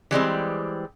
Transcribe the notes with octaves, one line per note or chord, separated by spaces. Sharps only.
E3 G3 G#3 C4